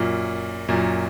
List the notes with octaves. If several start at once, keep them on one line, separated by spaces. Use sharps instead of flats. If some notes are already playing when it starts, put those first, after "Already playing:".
Already playing: F#2 A#2
F#2 A#2